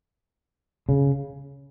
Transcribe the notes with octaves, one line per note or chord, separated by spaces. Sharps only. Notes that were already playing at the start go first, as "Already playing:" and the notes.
C#3